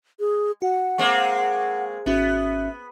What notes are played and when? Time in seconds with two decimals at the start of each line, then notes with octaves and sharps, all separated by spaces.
0.20 G#4
0.62 F#4 F#5
0.98 G#3 A#3 C4 C#6
2.06 G#1 B3 C#4 F#4 E5